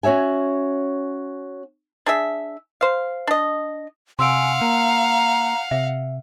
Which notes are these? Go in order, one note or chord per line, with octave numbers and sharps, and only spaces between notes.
C#4 F#4 C#5 E5 G#5
D4 G#4 E5
C5 F5
D4 D#5
C3 F5 F#5 G#5 C6 E6 D7
A#3 A#5
C3 E5